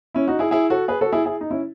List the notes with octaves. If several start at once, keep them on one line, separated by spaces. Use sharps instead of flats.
C#4 E4
D#4 F#4
E4 G#4
E4 G#4
F#4 A4
G#4 B4
F#4 A4
E4 G#4
E4 G#4
D#4
C#4 E4